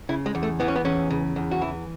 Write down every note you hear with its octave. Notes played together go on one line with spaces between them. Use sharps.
C#3 E4
G#3
E2
A3
E3 B3
C#4
B3
E2 C#4
C#3
E2
F#4
E3 E4